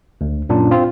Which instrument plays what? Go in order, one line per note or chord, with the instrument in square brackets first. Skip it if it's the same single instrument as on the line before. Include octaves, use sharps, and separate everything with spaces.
[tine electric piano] D2
F#2 A#2 D4
C4 F4